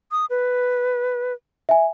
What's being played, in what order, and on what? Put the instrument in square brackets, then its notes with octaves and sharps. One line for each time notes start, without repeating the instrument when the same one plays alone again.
[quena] D#6
B4
[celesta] E5 G#5